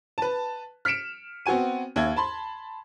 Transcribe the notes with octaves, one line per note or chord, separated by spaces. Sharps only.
B4 A5
F6 B6 C#7 D7 E7
B3 C4 F#4 G#5 D#7
D#2 E5 G#6
A5 B5 C6